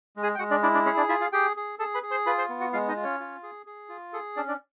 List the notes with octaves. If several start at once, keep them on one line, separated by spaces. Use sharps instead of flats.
G#3
G#4 G#5
G5
G#3 F#4 F#5
D4 D5
D4 E4 D5
D4 D5
C#4 G#4 C#5
D4 D5
E4 F4 E5
F4 F5
G4 G#4 G5
G#4
G#4 A4 A5
B4 B5
G#4
C5 C6
F4 B4 B5
C5 C6
B3
F#4 F#5
G#3 F4 F5
D#4 D#5
F4
C#4 C#5
F4
G#4
G#4
F4
G#4 A4
C#4 D4 D5
D4 D5